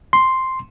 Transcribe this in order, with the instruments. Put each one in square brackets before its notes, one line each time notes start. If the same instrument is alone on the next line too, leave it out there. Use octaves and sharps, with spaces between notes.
[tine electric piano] C6